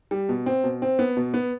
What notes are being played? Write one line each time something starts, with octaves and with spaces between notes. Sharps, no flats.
G3
B2
C4
B2
C4
B3
B2
B3